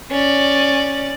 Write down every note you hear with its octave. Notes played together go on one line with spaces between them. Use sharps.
C#4 D5